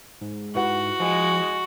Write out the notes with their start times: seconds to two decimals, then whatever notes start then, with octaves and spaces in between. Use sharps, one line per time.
0.21 G#2
0.55 E4 F#4 B4 F#5
1.00 F3 G#3